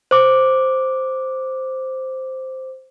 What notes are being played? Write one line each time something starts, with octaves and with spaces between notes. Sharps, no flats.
C5 D6